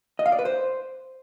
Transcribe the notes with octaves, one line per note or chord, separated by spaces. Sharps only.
D#5
F5
D5
B4
C5